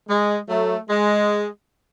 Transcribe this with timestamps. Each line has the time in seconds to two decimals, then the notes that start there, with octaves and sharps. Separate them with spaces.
0.09 G#3
0.49 F#3 A3
0.90 G#3